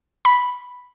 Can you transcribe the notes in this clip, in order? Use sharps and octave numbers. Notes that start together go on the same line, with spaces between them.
B5